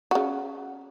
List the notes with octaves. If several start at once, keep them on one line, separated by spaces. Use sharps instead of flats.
C#3 F#4